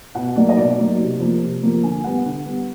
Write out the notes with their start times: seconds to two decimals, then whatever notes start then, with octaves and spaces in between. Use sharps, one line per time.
0.15 B2 F#5
0.35 F#3 A#3 D#4 D5
0.49 D#5
0.57 B2 D5
0.78 F#3 A#3 D#4
0.99 C3
1.20 F3 A#3
1.41 C3
1.62 F3 A#3
1.83 D3 G#5
2.04 G3 B3 F#5
2.25 D3
2.46 G3 B3